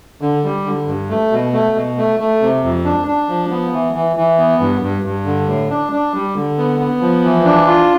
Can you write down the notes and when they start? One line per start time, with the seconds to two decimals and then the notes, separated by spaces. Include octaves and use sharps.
0.21 D3
0.44 G3
0.65 D3
0.87 G2
1.10 A3
1.32 B2
1.53 A3
1.75 B2
1.98 A3
2.20 A3
2.41 C3
2.63 F2
2.85 D4
3.07 D4
3.29 F3
3.50 B3
3.73 E3
3.95 E3
4.17 E3
4.38 B3
4.60 G2
4.82 G2
5.05 G2
5.25 D3
5.47 A2
5.70 D4
5.92 D4
6.14 G3
6.35 D3
6.58 B3
6.80 B3
7.01 F3
7.24 E3
7.45 D4
7.67 F4